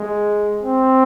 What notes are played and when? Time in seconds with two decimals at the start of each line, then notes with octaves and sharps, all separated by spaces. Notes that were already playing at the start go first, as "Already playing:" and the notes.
Already playing: G#3
0.62 C4